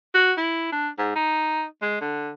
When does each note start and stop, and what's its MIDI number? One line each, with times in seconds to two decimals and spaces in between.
0.15 0.32 66
0.37 0.70 64
0.72 0.88 62
0.98 1.11 44
1.16 1.64 63
1.82 2.01 56
2.01 2.31 50